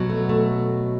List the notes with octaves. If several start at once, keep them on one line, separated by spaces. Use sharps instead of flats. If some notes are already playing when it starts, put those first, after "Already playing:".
Already playing: B2 F#3
A3
A3